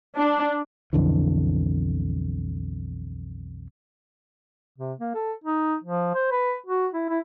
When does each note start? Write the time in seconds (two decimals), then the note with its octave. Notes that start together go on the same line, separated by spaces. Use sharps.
0.17 D4
0.93 B1 F2 D3 E3
4.78 C3
5.00 A#3
5.14 A4
5.44 D#4
5.84 F3
6.14 C5
6.32 B4
6.66 F#4
6.93 E4
7.10 E4